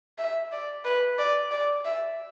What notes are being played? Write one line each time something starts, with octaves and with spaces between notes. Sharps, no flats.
E5
D5
B4
D5
D5
E5